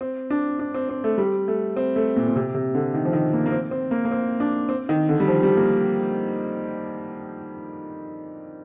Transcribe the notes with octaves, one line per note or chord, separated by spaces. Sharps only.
C4
D4
D4
C4
C4
A3
G3
A3
C4
A3
A#2
A#2
C3
C3
D3
D#3
F3
D#3
A#3
A#3
C4
C4
A#3
A#3
C4
D4
C4
D#3
D3
G3
F3
G3
A#3